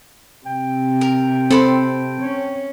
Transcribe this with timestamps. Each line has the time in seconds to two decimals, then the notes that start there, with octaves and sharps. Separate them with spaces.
0.46 C3 G5
1.01 A#4
1.51 C4 A4 B5 C6
2.21 C#4